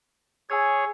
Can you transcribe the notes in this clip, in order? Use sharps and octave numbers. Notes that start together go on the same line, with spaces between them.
G#4 C#5 G#5 E6 G#6